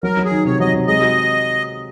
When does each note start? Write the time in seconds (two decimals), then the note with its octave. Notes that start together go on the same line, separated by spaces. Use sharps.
0.03 F#3 A#4
0.17 F#3
0.25 G#4
0.31 D#3
0.45 C3 C#5
0.60 F#3 D#5
0.74 C3
0.87 G#3 D#5
1.02 F#4